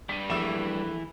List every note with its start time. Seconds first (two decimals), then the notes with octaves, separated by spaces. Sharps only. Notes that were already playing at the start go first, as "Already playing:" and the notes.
0.09 G2 G3 B6 D#7
0.30 A#1 E3 A3 E6 E7